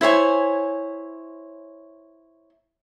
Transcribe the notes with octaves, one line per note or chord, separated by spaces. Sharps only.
E4 C5 C#5 G#5